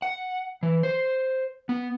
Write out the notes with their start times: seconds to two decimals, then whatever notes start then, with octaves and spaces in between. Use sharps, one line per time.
0.02 F#5
0.63 E3
0.83 C5
1.69 B3